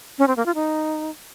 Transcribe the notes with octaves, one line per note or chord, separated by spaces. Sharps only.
C#4
C4
A#3
F4
D#4